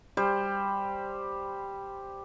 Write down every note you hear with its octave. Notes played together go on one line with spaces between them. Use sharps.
G3 G4 C5